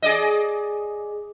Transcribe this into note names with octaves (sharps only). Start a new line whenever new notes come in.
G#4 D5 D#5